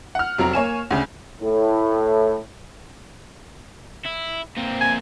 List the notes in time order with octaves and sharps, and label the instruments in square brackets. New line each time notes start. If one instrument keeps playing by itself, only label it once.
[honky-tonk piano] F#5 F6
F1 F#3 C4 A#5
A#3 C#5 G#5 E7
D2 C#3
[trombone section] A2
[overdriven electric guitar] E4
A#2 C4
[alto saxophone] G#5